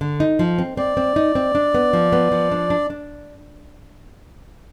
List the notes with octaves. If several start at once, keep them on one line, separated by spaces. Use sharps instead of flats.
D3
D#4
F3
C4
C4 D5
C4
D#4
C4
D4
B3
F3
B3
F3
D4
D4
D4